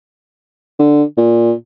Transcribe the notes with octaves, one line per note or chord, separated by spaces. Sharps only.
D3
A#2